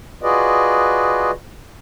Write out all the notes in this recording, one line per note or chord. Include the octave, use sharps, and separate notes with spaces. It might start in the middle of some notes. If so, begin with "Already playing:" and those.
F4 F#4 G#4 B4 D5 D#5